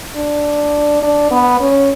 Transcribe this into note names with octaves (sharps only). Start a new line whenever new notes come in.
D4
D4
B3
C#4